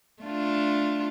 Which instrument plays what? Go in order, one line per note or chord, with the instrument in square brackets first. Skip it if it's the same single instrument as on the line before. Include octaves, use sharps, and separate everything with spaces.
[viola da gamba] A3 D4 F4